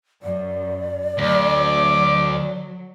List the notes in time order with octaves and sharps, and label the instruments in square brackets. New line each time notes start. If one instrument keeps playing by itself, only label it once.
[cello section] F#2 [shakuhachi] D5
[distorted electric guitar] D2 [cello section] F#3 [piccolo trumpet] D6